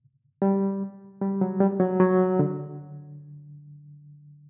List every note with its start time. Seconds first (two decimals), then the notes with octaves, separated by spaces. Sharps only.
0.42 G3
1.22 G3
1.41 F#3
1.60 G3
1.80 F#3
2.00 F#3
2.39 D3